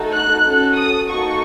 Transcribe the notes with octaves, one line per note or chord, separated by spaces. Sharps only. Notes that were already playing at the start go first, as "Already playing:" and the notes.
Already playing: A3 D#4 F#4 A4
F#6
C#4 F#4 A4
D#6
A#3 D#4 F#4 A4 C#6